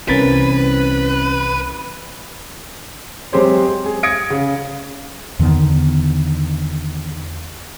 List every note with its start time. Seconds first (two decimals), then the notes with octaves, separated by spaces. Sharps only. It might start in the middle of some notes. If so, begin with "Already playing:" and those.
0.08 C2 E3 C4 C#4 A#4 B4 A6 B6
3.33 F#3 G#3 C4 G4 C5 C#5
3.85 G#4
4.03 D#6 G#6 A#6 C#7 D7
4.30 C#3
5.39 E2 D3 D#3 B3